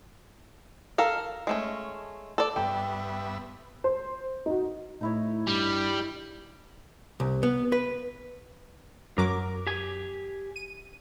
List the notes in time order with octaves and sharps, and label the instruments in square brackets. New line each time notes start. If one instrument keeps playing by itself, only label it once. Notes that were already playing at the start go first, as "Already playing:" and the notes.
[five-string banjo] A4 A#4 F5
G#3 A3 C#4
A4 D5
[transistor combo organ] G2 B3 E5 [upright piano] G5
[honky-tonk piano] C5
D#4 F#4
[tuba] A2 [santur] D#4 E4 C#5
[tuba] G2 [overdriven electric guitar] G3
[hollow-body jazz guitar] C2
B3
B4
[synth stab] F#2 F#3 D6 [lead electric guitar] A#4
[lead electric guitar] G4 G#5
[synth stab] D#7